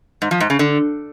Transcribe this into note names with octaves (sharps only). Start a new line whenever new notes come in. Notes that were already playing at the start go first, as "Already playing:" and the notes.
G#2
F3
G#2
C#3
D3